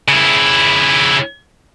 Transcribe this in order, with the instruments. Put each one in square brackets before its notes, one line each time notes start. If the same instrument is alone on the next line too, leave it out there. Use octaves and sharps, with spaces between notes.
[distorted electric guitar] C#3 E4